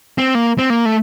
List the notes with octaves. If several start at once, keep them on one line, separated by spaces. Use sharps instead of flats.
C4
A#3
C4
A#3
A3